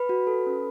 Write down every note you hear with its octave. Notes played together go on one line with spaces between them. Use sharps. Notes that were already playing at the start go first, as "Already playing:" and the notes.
Already playing: B4 B5
F#4
A4
C#4